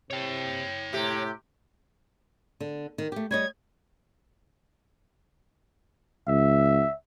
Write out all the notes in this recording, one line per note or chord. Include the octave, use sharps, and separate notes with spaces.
C3 C#5 G5
A2 C3 G4
D3
D#3
A3 G4
G3 C#5 D#5 G#6
C#2 E5